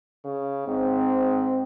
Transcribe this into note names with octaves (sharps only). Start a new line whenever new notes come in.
C#3
G#2 C4